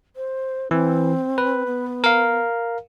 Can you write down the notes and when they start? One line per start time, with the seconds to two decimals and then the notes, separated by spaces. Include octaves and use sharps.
0.16 C5
0.71 E3 C4
1.38 B4
1.66 B3
2.04 A#4 F5